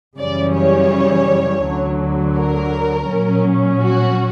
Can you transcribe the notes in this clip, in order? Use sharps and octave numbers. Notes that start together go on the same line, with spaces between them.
F#2 C#3 E3 G3 C#4 D5
C#5
D2 D3 F#3
A#4
A#2 F#3 C#4
F#4